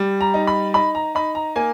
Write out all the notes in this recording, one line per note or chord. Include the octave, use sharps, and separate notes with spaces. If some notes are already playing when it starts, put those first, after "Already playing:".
Already playing: G3
A#5
D#4
B5
D#4 B5
A#5
D#4 B5
A#5
A#3 G#5